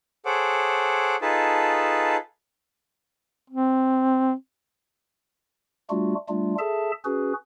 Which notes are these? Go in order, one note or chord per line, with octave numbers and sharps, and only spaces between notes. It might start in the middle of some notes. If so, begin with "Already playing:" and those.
G#4 A4 C5 C#5 F#5 D6
D#4 F4 G#4 A4 B4 A5
C4
G3 A3 D4 F4 F#4
G3 A3 D4 F4
G#4 A4 E5 A5
C#4 F#4 G#4 B4